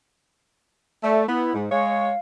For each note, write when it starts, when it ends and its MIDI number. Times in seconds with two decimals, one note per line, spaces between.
1.04 1.27 57
1.04 1.23 74
1.28 1.49 59
1.28 1.54 64
1.54 1.66 44
1.71 2.11 56
1.71 2.11 73
1.71 2.19 77